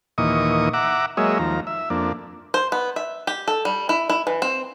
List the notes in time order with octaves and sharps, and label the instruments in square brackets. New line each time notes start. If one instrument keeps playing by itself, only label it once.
[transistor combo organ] D#2 A#2 E3 D#5 C#6 D#6
E5 F#5 A#5 D6
F#3 G#3 A#3 C#5 D#5 E5
D#2 F3 A#5
E5
F2 A#3 D4
[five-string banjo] C5
B3
E5
G4
A4
G3
E4
E4
E3
C4